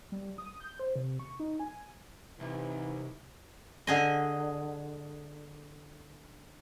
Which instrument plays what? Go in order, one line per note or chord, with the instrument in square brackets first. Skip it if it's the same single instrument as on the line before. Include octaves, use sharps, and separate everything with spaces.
[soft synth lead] G3
D#6
G6
C5
C3
C#6
D#4
G#5
[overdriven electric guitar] C2 [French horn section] C3 E3 D#4
[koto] D3 G#4 D#5